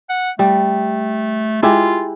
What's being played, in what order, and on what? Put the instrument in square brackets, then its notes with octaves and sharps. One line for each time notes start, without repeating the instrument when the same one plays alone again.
[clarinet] F#5
[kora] G3 [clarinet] A3
[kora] G#3 E4 G4 [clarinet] F4